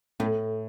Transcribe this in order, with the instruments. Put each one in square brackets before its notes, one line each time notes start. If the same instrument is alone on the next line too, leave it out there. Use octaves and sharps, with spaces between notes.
[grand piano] A2 [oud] A3